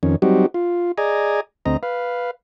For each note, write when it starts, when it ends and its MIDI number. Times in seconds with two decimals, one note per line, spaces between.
0.03 0.16 41
0.03 0.16 51
0.03 0.16 61
0.22 0.46 54
0.22 0.46 55
0.22 0.46 60
0.22 0.46 63
0.22 0.46 66
0.22 0.46 67
0.54 0.92 65
0.98 1.40 68
0.98 1.40 74
0.98 1.40 75
0.98 1.40 80
0.98 1.40 82
1.66 1.77 38
1.66 1.77 60
1.66 1.77 75
1.66 1.77 82
1.83 2.31 71
1.83 2.31 77